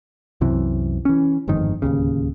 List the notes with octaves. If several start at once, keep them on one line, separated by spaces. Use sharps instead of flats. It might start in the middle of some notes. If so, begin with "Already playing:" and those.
C2 F#2 C3 E3
E3 C#4
G1 F2 G#2 D#3
D1 G1 D#2 C#3